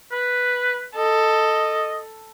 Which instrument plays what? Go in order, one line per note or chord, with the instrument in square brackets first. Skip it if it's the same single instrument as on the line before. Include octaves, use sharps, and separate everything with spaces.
[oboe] B4
[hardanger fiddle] A4 [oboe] D#5